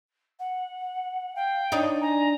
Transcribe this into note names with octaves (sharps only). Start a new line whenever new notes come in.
F#5
F5 G5
D4 D#4 C#5
G#5 A#5